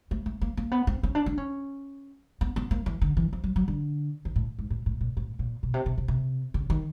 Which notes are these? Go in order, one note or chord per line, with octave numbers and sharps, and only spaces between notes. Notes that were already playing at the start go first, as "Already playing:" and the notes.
A3
A3
A#3
A#3
B3
C4
C#4
D4
D4
C#4
B3
B3
A#3
E3
D3
E3
F3
F#3
F#3
D3
D#3
A2
G#2
A2
A2
A#2
A2
A#2
B2
C3
C3
C3
C3
C#3
D#3